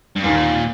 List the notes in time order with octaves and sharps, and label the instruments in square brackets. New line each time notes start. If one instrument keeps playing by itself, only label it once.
[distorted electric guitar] G2
[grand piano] D#2 D#3 A#3 [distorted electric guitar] A#2